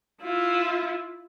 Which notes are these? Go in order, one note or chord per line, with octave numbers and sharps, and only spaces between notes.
E4 F4